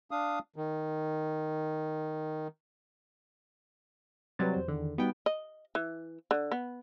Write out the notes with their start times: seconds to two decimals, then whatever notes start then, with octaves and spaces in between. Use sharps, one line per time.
0.11 D4 F5 D#6
0.56 D#3
4.39 C3 F#3 G3 B4 A6
4.54 E2 C5
4.68 E2 D3 D#3
4.98 G3 B3 D#4 F#4 G5
5.26 D#5
5.75 E3
6.31 D3
6.52 B3